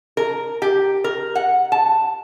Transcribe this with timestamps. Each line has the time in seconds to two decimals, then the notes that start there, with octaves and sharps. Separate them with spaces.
0.17 A#4
0.62 G4
1.04 A#4
1.35 F#5
1.72 A5